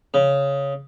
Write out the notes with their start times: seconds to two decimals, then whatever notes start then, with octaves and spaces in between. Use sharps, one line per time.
0.14 C#3